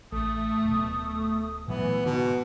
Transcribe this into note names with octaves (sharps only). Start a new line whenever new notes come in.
A1 A3 D#6
D1 B2
A#2 E3 F#3 A3 B3
G#2 B2 D3